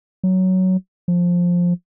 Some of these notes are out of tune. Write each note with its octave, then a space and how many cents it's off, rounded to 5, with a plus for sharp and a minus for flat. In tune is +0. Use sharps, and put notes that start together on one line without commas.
F#3 +10
F3 +10